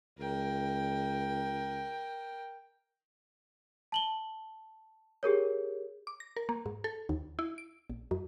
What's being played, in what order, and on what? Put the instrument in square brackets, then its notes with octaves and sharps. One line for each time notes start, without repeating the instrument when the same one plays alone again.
[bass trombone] C#2 [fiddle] A#4 G5
[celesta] A5 F#7 G7
G4 G#4 A#4 C#5
[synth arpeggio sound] D6
A#6
A#4
A#3
G#2
A4
D#2
E4
D7
A#1
F#2